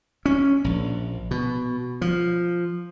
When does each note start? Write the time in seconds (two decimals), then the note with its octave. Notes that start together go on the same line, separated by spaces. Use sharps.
0.26 C#4
0.64 A#1
1.31 B2
2.01 F3